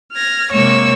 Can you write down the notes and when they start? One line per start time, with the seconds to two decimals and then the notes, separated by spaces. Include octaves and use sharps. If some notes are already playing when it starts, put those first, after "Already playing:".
0.13 F6 G#6 A#6
0.52 C3 G#3 A#3 C#5 C#6 E6